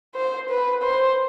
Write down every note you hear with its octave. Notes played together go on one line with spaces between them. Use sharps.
C5
B4
C5